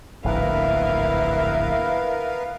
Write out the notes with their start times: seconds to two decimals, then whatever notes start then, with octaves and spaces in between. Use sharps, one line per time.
0.24 D1 A#1 G#2 B3 E4 A#4 B4 F5